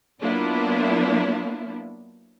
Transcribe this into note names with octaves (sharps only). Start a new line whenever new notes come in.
F#3 A#3 B3 D4 E4 F4